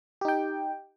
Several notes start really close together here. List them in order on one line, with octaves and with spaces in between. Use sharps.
G4 D#4 G5